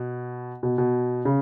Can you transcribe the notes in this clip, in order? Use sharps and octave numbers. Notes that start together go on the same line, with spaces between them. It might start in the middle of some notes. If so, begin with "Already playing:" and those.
Already playing: B2
B2
B2
C#3